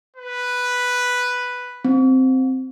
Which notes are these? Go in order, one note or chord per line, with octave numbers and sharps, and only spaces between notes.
B4
C4